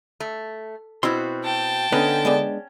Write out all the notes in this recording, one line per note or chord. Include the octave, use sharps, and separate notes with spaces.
A3
B2 C4 E4 F#4 C6
G5 A5
D3 B3 C#4 D#4 B4
G#3 B3 D4